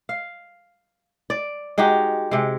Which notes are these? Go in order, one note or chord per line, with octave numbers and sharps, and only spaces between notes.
F5
D5
G#3 D#4 F#4 G4
C3 G#3